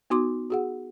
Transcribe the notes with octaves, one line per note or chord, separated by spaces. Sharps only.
B3 D#4 F#4 C6 D6
F#4 G#4 F#5